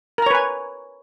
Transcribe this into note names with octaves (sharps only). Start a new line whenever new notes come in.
A#4 B4 C#5 G#5 A#5